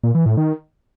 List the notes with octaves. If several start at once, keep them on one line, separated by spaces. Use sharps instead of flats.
A#2
E3
A2
D#3